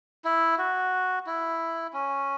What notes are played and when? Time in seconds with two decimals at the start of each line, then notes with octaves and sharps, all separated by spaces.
0.25 E4
0.58 F#4
1.27 E4
1.93 C#4